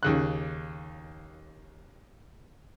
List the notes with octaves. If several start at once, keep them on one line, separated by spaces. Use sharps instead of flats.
D#2 C#3 F#6